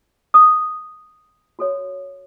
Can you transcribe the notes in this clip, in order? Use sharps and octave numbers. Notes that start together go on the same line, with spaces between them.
D#6
F#4 A4 C#5